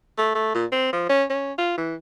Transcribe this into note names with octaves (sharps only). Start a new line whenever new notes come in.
A3
A3
A#2
C4
F3
C#4
C#4
F4
E3